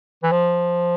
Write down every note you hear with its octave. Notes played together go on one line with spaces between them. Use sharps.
E3
F3